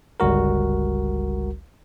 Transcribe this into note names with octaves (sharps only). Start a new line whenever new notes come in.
G1 C#2 G3 F#4 A#4